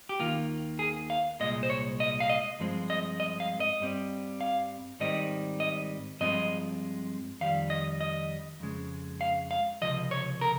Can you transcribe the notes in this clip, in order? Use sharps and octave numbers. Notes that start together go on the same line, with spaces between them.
G4
D#2 D#3 A#3 F4
G#4
F5
C2 A#2 G#3 D#5
C5
C#5
D#5
F5
D#5
G2 F3 G#3 C4
D#5
D#5
F5
D#5
G2 G3 C4
F5
G#2 D#3 G3 C4 D#5
D#5
G2 F3 G#3 C4 D#5
F2 D#3 G3 F5
D#5
D#5
F2 C#3 G#3
F5
F5
C#2 C3 F3 D#5
C#5
A#4